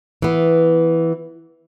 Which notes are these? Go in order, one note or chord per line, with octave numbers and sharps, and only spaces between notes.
E3 B3